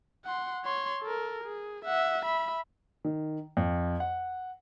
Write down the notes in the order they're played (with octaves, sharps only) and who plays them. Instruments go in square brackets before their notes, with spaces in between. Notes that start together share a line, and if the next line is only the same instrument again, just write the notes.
[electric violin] F#5 C6
C#5 C6
A4 A#4
G#4
E5 F#5
E5 B5
[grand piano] D#3
F2
F#5